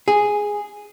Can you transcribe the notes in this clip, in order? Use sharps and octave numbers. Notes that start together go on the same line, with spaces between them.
G#4